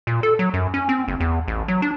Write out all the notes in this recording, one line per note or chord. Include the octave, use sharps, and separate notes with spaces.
A#2
A4
F#3
F#2
C#4
C4
F#1
E2
A1
F#3
D4